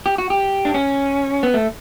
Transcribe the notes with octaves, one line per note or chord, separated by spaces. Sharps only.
G4
F#4
G4
D4
C#4
B3
A3